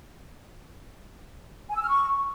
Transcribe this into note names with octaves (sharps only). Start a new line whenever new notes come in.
G#5
E6
F6
C#6